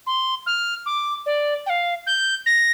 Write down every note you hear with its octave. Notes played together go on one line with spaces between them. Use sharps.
C6
F6
D6
D5
G5
F5
G6
A#6